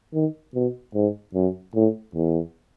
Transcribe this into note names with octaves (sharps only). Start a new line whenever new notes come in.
D#3
B2
G#2
F#2
A2
E2